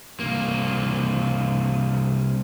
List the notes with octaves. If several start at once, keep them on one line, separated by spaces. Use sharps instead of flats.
C2 A#3